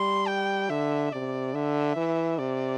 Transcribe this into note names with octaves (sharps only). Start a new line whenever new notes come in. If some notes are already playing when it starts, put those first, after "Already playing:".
Already playing: G3 C6
G5
D3 E5
C3 D5
D3 E5
E3
C3 D5